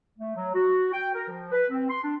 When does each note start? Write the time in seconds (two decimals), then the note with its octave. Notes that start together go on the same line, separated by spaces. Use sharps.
0.19 A3
0.36 F#3
0.54 F#4
0.92 G5
1.14 A#4
1.28 F3
1.52 B4
1.71 C4
1.89 C6
2.03 D4